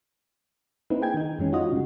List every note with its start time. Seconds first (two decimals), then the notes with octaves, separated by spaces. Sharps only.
0.90 A#3 C4 D#4 E4 B4
1.02 G#4 G5 G#6
1.14 D#3 D#4
1.39 F#2 E3 G#3 C#4
1.52 D#4 F4 F#4 D#5
1.72 C#3 G#3